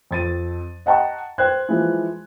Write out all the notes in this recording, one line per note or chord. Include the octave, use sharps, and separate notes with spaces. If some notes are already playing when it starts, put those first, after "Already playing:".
F2 A6 D#7
D#5 F#5 G5 A5 A#5 C#6
C5 G5 F#6 G#6
E3 F3 G#3